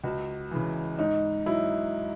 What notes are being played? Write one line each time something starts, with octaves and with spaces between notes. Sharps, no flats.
C#2 F#4
C#3 E3
G#2 D#4
F#3 E4